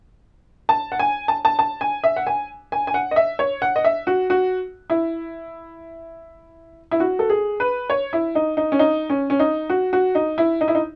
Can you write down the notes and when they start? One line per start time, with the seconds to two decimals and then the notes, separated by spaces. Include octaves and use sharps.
0.69 A5
0.92 F#5
0.99 G#5
1.28 A5
1.45 A5
1.59 A5
1.81 G#5
2.04 E5
2.16 F#5
2.27 G#5
2.72 G#5
2.87 G#5
2.94 F#5
3.11 D#5
3.16 E5
3.39 C#5
3.62 F#5
3.76 D#5
3.85 E5
4.07 F#4
4.30 F#4
4.90 E4
6.91 E4
7.00 F#4
7.19 A4
7.30 G#4
7.60 B4
7.90 C#5
8.13 E4
8.35 D#4
8.57 D#4
8.72 C#4
8.79 D#4
9.10 C#4
9.30 C#4
9.39 D#4
9.70 F#4
9.93 F#4
10.15 D#4
10.38 E4
10.61 D#4
10.68 E4
10.75 D#4